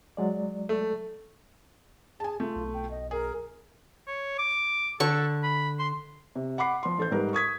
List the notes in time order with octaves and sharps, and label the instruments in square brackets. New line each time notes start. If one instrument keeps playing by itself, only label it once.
[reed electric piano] F#3 G#3 D5
[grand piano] A3
[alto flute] G#4 [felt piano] G#5 A5
[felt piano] A3 [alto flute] F4
[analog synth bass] B1
[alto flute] G5
D#5
[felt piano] G#4 [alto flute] A#4
[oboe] C#5
D6
[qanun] D3 C#6 [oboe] A4
[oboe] B5
C6
[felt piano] C3
F#5 B5 D6 C7
F3 C6
A1 A4 C5 G6
G#2 G3 A#4 B4
C#6 D#6 G#6 B6